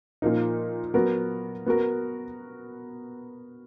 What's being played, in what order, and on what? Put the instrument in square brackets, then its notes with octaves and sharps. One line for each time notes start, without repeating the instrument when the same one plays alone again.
[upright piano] A#2 F3 A#3 D#4
F#3 B3 F#4 A#4
B3 F#4 A#4